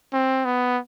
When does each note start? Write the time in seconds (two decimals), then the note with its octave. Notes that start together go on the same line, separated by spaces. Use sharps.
0.13 C4
0.45 B3